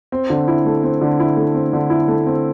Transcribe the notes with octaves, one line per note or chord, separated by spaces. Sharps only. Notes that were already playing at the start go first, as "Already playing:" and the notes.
C4
D3
E4
A3
C4
D3
E4
A3
C4
D3
E4
A3
C4